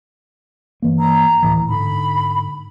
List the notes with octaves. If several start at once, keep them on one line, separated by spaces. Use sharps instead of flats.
G2 E3 A#3
A#5
D2 A2 E3
G#2 D3 B5